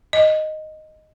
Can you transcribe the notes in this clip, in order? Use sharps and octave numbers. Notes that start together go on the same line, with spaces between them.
D#5